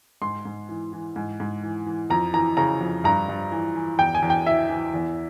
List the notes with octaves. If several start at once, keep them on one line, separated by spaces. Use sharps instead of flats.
G#2 C6
G#2
E3
E3
G#2
G#2
E3
E3
F2 A#5
E3 A#5
C#3 A#5
F2
G2 A#5
G2
E3
E3
E2 G5
G#5
E2
G5
E3 E5
E3
E2